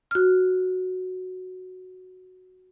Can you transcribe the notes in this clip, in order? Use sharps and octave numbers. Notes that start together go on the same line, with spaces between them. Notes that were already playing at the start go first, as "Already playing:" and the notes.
F#4 F6